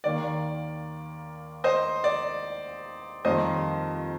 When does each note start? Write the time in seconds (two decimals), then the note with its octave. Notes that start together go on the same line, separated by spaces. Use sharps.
0.04 D#2 D#3 A#3 D5
1.64 C5 D#5
2.04 D5
3.25 F2 D#3 G3 A#3 C5 D#5